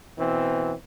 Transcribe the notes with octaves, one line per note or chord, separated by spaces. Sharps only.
B2 E3 C4